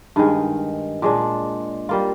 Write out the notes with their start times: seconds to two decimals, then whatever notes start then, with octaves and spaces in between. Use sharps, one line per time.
0.16 G2 D#3 G#3
1.02 A#2 G#3 D4
1.89 G3 A#3 F4